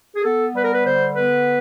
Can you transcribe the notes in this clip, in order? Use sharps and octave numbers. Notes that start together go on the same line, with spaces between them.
G#4
B3 A4
G3 B4
A#4
B4
D3 C5
B3 B4